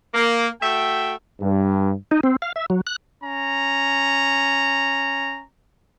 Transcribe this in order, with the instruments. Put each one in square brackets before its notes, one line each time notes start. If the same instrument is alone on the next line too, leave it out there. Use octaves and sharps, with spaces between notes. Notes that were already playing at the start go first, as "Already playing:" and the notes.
[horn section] A#3
A3 F#4 E5 G5
[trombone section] G2
[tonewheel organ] D#4
C4
F5
E5
F#3
F#6
[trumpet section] C#4 A#5